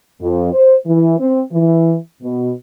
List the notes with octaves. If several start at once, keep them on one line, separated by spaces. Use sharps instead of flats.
F2
C5
E3
C4
E3
B2